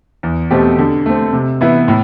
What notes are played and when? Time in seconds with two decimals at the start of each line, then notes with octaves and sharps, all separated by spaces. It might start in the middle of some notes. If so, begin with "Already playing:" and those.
0.23 E2
0.51 B2 A3 C4 G4
0.78 D3
1.06 A3 C4
1.33 C3
1.61 E3 B3 E4
1.88 A2